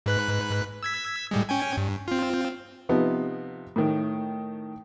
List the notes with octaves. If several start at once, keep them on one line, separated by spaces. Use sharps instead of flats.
G#2 B4 F#6
E6 G#6 B6
A2 G3 G#3
C#4 G5 G#5
G2
C4 F4
C3 F3 B3 D#4
A2 D#3